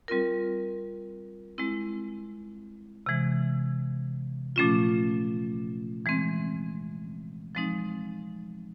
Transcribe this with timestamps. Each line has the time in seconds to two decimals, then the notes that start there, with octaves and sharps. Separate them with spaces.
0.08 G3 C4 F4 A#4
1.58 G#3 C4 E4
3.06 C3 E3 G#3
4.56 A#2 F3 A3 C#4 F4
6.06 E3 G#3 C4
7.55 F3 G#3 C4 D#4